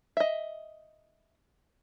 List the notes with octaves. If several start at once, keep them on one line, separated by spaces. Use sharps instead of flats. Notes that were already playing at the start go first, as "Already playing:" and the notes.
D#5 E5